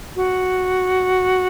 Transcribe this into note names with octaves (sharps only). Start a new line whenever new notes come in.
F#4